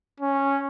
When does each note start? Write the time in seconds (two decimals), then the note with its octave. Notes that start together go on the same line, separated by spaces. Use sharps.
0.20 C#4